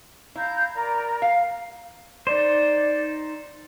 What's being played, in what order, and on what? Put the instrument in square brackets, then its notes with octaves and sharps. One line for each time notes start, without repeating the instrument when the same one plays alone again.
[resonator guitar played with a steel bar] E4 [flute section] F5 A#5 G6
[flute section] A#4 D5 A#5
[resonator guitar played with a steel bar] F5
[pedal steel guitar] D#4 C5 [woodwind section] D5